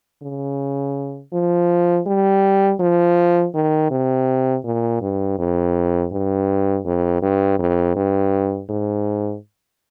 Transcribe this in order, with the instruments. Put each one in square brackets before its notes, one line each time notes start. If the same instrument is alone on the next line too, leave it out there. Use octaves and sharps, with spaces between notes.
[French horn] C#3
F3
G3
F3
D#3
C3
A#2
G2
F2
G2
F2
G2
F2
G2
G#2